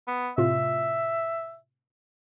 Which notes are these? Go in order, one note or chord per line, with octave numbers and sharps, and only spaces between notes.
B3
A2 C3 F4 E5